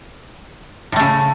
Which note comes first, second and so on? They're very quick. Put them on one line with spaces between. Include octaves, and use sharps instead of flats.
A2 A3 C#3